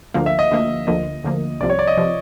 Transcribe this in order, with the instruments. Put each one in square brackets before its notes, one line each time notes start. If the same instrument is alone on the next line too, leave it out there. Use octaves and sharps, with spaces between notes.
[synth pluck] D2 D3 F3 A#3 [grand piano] F5
[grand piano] E5
D#5
[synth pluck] D2 D3 F3 A#3
[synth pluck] D2 D3 F3 A#3 [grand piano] D#5
[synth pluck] D2 D3 F3 A#3
[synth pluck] C2 C3 F3 [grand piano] D5
[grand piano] C#5
D5
D#5
[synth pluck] C3 F3